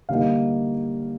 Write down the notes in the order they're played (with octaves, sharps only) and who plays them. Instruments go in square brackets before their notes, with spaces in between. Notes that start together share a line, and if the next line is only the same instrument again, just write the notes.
[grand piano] D3 G3 A#3 D#4 F5